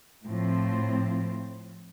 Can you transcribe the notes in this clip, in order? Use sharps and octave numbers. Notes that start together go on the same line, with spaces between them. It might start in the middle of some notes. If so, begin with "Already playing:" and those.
A2 F3 C4